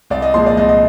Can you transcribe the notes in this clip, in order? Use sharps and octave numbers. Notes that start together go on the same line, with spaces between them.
C2 D5
D#5
A#2 F3 G#3 C6
D5
C2 D#5
D#5